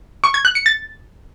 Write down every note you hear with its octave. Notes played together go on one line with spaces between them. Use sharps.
C#6
G#6
F#6
C#7
A6